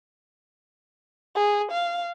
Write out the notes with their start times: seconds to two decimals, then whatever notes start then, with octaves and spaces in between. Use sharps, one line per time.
1.35 G#4
1.71 F5